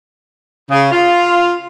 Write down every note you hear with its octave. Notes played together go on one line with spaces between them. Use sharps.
C#3
F4